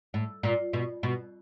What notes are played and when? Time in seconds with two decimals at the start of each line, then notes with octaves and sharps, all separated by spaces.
0.14 A2
0.43 A#2
0.73 B2
1.03 B2